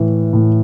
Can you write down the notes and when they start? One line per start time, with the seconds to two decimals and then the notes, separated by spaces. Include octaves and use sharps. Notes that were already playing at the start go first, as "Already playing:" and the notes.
Already playing: A2 E3
0.33 A2